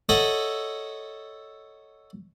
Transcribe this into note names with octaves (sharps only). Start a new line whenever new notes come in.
A4 C#5 D#5 E5 F#5